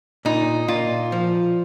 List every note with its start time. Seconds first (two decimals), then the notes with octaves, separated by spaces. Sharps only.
0.25 A#2 D#4
0.68 A#2 F4
1.12 F3